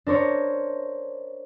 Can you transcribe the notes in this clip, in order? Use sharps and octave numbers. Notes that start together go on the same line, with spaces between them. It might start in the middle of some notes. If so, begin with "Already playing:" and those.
D4 A#4 C5 C#5